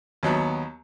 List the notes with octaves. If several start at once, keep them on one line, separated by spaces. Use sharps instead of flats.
D#2 F#3 B3